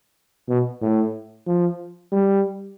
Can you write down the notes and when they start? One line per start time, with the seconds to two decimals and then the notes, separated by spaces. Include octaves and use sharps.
0.49 B2
0.81 A2
1.47 F3
2.12 G3